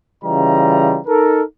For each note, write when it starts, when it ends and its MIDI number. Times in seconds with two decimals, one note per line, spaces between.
0.24 1.00 49
0.24 1.00 52
0.24 1.00 55
0.24 1.00 65
0.24 1.00 75
0.24 1.00 82
1.07 1.42 63
1.07 1.42 69
1.07 1.42 70